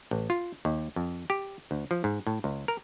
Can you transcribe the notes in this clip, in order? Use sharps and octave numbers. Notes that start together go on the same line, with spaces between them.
A1
F4
D#2
F2
G4
D2
F3
G#2
A2
C#2
A#4